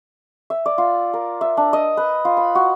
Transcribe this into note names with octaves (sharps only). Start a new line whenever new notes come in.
E5
D5
F4
A#4
E5
D4
D#5
B4
F4
B5
F#4